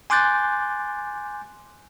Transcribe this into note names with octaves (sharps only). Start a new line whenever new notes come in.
G#5 C6 D6 F#6 G6 A6